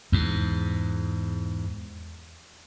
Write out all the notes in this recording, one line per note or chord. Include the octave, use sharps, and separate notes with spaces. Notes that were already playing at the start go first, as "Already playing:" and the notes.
E2 G#2